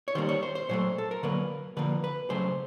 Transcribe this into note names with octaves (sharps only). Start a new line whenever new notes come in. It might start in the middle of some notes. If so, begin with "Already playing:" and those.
C#5
D#3 G3 A#3 C5
C#5
C5
C5
A#2 F#3 A3 C5
A4
A#4
D3 F#3 A#3 B4
D3 F3 A#3 B4
B4
C#3 F#3 A3 C5